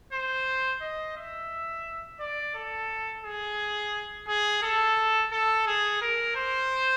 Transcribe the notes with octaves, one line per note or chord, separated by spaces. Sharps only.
C5
D#5
E5
D5
A4
G#4
G#4
A4
A4
G#4
A#4
C5